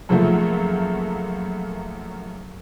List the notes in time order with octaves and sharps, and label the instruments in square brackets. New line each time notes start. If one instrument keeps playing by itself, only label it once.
[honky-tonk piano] F#2 C#3 F3 F#3 A3 A#3